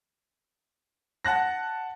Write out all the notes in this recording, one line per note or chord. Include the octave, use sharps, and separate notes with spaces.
F#5 A5 F#6 A#6